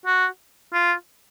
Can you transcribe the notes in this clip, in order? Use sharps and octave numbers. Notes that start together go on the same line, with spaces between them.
F#4
F4